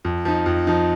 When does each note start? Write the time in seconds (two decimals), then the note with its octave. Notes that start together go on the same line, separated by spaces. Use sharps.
0.05 F2
0.25 F3 D#4
0.46 F2
0.67 F3 D#4